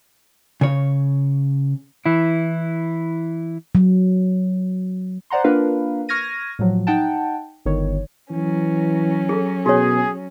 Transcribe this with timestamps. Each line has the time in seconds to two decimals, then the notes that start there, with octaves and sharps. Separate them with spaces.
0.61 C#3 C#5
2.06 E3 E4
3.75 F#3
5.30 C5 D5 F#5 A#5 C6
5.44 A#3 D4 F4 A#4 B4 F5
6.09 C#6 F6 G#6 A#6 D#7
6.59 A2 F3 F#3
6.87 D#4 F#5 G5 A5
7.65 G1 D#3 C#5
8.31 E3 F#3 C#4
9.29 G#4 A4
9.66 B2 F#4 G#4 C#5